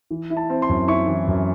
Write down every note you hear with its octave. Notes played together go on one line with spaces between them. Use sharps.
E3
E4
A5
C4
C6
F#2
E4 C#6
E3
F#2